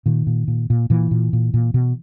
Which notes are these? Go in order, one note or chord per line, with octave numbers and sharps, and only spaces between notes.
A#2 D#3
A#2
A#2
A#2
A#2 E3
A#2
A#2
A#2
B2